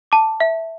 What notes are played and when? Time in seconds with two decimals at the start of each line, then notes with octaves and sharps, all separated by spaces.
0.12 A5 D6
0.40 E5